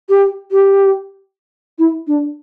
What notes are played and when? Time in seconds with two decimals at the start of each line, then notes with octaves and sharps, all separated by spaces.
0.09 G4
0.52 G4
1.79 E4
2.07 D4